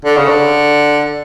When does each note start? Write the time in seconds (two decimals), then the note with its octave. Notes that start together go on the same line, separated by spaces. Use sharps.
0.05 D3
0.17 C#3
0.28 D3